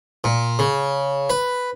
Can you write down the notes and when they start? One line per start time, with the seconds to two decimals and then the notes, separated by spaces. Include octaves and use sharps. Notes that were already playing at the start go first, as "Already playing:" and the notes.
0.24 A#2
0.59 C#3
1.30 B4